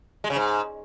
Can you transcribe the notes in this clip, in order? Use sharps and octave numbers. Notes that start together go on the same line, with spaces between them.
G#3
C#3
G#2